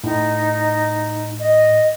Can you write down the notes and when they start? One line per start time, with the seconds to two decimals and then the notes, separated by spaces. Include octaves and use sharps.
0.04 A2 D#4
1.40 D#5